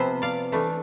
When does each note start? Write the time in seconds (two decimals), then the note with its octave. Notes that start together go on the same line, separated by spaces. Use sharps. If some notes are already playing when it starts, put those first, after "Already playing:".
Already playing: C3 F3 B3 C5 E5
0.22 D5 F5
0.52 E3 A3 D4